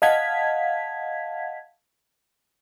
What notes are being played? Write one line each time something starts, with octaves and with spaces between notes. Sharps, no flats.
D#5 F5 F#5 A5 G#6 B6